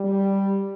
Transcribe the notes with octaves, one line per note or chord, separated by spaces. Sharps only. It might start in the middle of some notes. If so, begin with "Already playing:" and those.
Already playing: G3